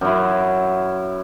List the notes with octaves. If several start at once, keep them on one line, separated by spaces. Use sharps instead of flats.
F#2 E4